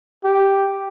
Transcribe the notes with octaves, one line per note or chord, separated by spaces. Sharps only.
G4